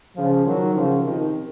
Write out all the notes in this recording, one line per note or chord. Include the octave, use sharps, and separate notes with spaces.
C#3 F3
D#3 F#3
C#3 F3
C3 D#3